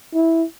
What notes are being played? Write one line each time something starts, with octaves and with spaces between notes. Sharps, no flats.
E4